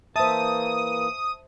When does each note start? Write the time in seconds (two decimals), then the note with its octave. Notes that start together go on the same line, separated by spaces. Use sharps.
0.16 E3 A#3 C5 E5 A5 D#6